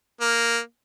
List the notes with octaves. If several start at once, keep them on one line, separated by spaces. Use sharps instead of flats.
A#3